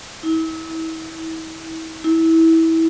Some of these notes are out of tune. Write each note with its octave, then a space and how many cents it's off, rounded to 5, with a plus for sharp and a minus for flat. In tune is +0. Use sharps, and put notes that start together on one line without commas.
E4 -35
E4 -20